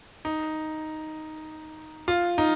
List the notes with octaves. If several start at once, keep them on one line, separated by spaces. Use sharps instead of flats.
D#4
F4
D#4